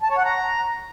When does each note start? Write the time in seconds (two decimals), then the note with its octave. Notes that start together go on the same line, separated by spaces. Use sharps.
0.02 A5
0.10 C#5
0.17 F#5
0.25 A#5